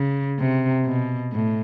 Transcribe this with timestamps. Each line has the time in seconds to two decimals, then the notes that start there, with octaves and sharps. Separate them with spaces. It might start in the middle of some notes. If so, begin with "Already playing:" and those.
Already playing: C#3
0.39 C3
0.86 B2
1.33 A2